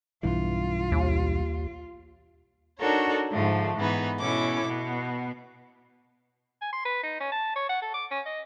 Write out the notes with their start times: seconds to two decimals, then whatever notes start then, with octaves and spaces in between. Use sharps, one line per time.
0.23 B1 G2 E3 F4
0.92 D#2
2.79 D4 D#4 F#4 A4 A#4 C#5
3.31 G#2 D3 F3 A3
3.76 G#2 E3 B3 D#4
4.20 B2 C#4 E4 A4 D6
4.66 B2 B3
6.62 G#5
6.73 C6
6.85 B4
7.03 D#4
7.20 C#4
7.32 A5
7.56 C#5
7.69 F#5
7.82 A4
7.94 D6
8.11 C#4
8.26 D#5